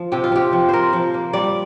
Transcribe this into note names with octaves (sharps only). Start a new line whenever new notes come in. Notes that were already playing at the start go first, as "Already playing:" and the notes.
Already playing: F3
C3 G4
F4
C3 G4
F3
A#3 A#4 C5
F3
A#3
G3 D5